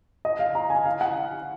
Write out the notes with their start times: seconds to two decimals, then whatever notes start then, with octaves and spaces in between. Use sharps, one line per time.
0.25 D#5
0.39 F5
0.55 A#5
0.70 G#5
0.86 F5
1.01 F#5